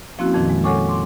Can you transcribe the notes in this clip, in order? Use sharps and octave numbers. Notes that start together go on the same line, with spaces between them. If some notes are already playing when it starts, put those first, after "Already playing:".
F3 A#3 C4 C#4 E4 F#4
F2 A#2 D#3 F3
G#3
A4 C#5 F#5 G#5 C#6 D6
C6 D6